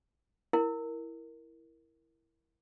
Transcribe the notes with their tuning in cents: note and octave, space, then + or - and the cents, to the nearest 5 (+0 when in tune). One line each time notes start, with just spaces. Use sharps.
E4 +0 A#4 +0